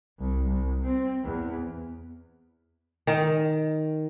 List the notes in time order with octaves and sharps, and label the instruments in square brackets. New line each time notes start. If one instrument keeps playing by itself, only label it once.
[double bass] C2
C2
C4
E2
[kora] D#3